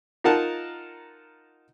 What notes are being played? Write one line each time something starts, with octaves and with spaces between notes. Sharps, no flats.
D#4 F4 A#4 F#5 A5